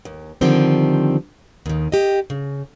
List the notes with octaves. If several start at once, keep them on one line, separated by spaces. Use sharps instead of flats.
D#2
D3 D#3 F3 G3 C4
D#2 D#3
G4 D#5
C#3